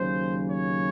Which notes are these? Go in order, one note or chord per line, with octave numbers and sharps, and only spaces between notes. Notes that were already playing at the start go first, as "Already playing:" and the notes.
Already playing: D#2 C#3 F#3 C5
C#5